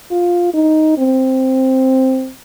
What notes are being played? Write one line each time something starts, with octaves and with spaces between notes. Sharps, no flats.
F4
D#4
C4